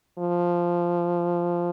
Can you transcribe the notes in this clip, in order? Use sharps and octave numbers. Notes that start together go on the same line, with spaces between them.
F3